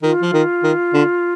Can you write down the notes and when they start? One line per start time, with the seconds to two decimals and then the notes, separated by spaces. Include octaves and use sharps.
0.03 D#3 F4
0.22 F3
0.33 D#3
0.63 D#3
0.94 D3